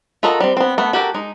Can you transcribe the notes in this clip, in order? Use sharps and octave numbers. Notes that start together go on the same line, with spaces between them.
F4 F#4 A4 A#4 D#5
G3 C4
B3 C4
A3 B3
F#4 G4 A4 A#4
G#3 D#4